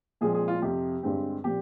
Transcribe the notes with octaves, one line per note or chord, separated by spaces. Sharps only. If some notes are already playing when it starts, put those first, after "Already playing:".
A#2 F3 G#3 C4 G#4
G#4
F4
F2 C3 F3 G4
G2 D3 G#3 C4
A#2 F3 C4 G4